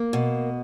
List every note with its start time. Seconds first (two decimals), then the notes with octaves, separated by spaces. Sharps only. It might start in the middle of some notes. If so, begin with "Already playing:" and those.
Already playing: A#3
0.13 B2